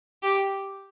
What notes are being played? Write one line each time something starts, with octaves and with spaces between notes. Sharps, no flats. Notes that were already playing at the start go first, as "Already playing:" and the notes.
G4